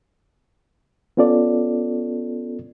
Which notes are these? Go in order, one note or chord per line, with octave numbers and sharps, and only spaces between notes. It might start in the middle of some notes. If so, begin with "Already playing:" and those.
B3 C#4 F4 A4 D5